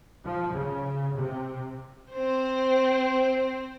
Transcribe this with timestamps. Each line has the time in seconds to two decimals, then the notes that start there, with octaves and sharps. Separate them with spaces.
0.24 F3
0.55 C#3
1.16 C3
2.12 C4 C5